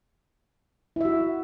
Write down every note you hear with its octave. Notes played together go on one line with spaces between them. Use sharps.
E4 F#4 E5